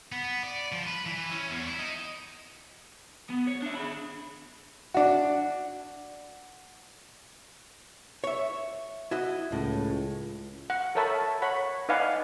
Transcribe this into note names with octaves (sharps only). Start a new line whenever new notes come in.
B3
D5
F3
B4
E3
C#4
E2
E4
D#4
B3
C#5
D4 E5
G#4 B5
D4 F#4
C#5 E5
E4 F#4 D#5
C#2 A2
F#5
A4 A#4 C#5 E5 A5 B5
C#5 F#5 B5
D#4 B4 D5 F5 F#5 G#5